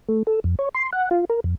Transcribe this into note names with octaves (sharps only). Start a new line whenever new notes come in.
A3
A4
F2
C#5
C6
F#5
F4
A#4
F2